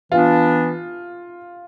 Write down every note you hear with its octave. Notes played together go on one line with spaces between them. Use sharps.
E3 B3 D4 F4